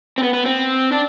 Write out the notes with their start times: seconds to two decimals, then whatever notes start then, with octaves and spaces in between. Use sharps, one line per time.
0.18 C4
0.23 B3
0.33 B3
0.46 C4
0.92 D4